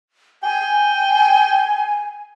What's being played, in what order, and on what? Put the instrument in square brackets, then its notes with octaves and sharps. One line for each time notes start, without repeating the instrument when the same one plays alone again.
[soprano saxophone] G5 [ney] G#5